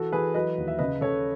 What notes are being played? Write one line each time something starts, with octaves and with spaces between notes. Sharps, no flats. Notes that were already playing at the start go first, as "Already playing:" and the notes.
Already playing: E3 F#4 A4
E3 G#4 B4
F#3 B4 D#5
D#2
E5
C#3 B4 D#5
C#3 A4 C#5